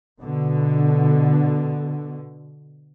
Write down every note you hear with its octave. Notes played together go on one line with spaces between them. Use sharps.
B2 D3